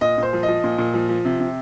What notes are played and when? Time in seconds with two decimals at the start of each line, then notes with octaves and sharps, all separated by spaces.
0.01 A#2 D#5
0.18 A#2 C5
0.33 F3
0.43 D#5
0.48 F3
0.64 A#2
0.78 A#2
0.94 F3
1.09 F3
1.25 C3
1.40 C3